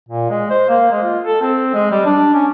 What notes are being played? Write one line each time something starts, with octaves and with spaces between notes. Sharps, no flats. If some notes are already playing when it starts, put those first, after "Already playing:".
A#2
G#3
C5
A#3
G#3
F4
A4
C4
G#3
G3
D4
C#4